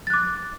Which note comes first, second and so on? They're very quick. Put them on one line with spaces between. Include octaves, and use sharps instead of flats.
A6 F#6 D6